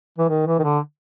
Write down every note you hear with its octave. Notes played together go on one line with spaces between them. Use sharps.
E3
D#3
E3
D#3
D3